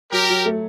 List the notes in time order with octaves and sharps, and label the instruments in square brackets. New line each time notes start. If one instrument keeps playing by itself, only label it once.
[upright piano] F#3 [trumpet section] G4 A#4
[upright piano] F#3
A3